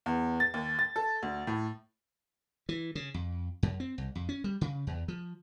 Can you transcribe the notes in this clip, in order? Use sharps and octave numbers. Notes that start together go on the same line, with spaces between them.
E2
A6
D#2
A6
A4
D2
A2
E3
C#3
F2
F#2
C4
C2
F2
C#4
G3
C#3
E2
F3